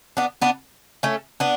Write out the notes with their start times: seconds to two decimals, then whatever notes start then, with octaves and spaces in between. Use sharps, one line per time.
0.17 B3 D4
0.42 B3 D4
1.03 A3 C#4
1.40 B3 D4